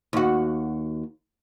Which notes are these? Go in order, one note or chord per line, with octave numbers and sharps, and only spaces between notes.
D#2 F#4